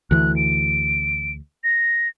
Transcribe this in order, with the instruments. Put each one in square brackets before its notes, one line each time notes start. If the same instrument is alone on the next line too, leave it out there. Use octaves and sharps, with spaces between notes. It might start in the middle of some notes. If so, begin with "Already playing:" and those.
[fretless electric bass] D2 E3 [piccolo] F#6
[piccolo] D7
A#6